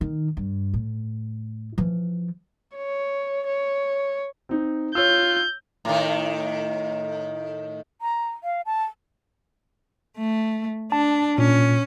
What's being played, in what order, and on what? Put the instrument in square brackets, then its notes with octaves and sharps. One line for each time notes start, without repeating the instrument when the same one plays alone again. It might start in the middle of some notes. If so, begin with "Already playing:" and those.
[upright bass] D#3
G2
A2
E3 F3
[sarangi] C#5
C#5
[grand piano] C4 D#4
[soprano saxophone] F4 [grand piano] C#5 E6 [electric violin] G6
[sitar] A2 D#3
[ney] A#5
F5
A5
[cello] A3
[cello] D4 [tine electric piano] A5
[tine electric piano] A#2 [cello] C#4